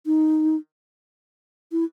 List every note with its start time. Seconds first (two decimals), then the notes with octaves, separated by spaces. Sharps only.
0.06 D#4
1.72 E4